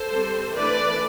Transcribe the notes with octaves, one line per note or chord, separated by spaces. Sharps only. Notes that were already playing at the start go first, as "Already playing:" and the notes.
Already playing: A4 C5
G3 C4
E3 A3 D4 B4 D5